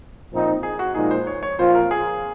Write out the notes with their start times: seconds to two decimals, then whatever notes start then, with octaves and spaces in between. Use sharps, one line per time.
0.31 A#2 F3 C4 D#4
0.63 G#4
0.79 F#4
0.95 A#2 F3 G#3 D#4 G#4
1.11 C5
1.27 C#5
1.43 C#5
1.58 A#2 F3 C4 F4 C5
1.75 A#4
1.91 G#4